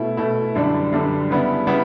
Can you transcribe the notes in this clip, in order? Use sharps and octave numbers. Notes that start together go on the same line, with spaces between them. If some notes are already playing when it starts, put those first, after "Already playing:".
Already playing: B2 A3 E4
B2 A3 E4
F#2 D3 G3 D4
F#2 D3 G3 D4
C#3 G3 B3 E4
C#3 G3 B3 E4